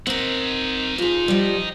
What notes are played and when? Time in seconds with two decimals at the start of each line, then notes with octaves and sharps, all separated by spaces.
0.07 C4 D#4 A#4 F#5
0.98 F2 F4 G#4
1.28 F3 G3